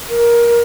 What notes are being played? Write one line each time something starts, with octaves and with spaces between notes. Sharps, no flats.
A#4